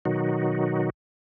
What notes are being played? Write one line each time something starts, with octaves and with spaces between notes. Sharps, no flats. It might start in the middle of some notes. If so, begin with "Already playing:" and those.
B2 D#3 F#3 D#4 F#4